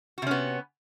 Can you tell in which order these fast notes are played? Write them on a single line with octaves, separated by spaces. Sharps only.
F#4 C3 C#4 B3